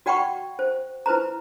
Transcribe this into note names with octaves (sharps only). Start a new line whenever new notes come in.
F#4 D5 F#5 G5 B5 C#6
C5
E4 B4 C5 A#5